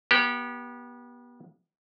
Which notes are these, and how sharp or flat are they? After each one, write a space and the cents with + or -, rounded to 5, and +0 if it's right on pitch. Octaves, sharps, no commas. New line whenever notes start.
B3 -30 G4 -10